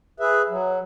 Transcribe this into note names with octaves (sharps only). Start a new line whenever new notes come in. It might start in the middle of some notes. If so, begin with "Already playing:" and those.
G#4 B4 E5
F#3